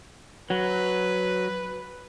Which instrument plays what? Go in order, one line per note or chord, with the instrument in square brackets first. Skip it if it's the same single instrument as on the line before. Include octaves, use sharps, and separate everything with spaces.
[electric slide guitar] F#3 [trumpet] B4